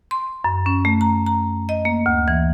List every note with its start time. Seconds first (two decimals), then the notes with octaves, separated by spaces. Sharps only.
0.11 C6
0.44 F#2
0.66 C#4
0.85 A3
1.01 A#5
1.26 A#5
1.69 D#5
1.85 A#3
2.06 D2
2.28 E3